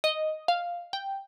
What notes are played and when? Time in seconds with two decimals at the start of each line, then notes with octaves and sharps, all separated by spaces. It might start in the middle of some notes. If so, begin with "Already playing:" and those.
0.04 D#5
0.48 F5
0.93 G5